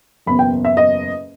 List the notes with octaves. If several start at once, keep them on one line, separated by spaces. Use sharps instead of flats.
F#1 E2 B2 B5
G5
E5
D#5